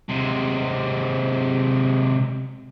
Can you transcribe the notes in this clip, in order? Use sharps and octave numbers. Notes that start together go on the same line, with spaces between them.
C3 G#3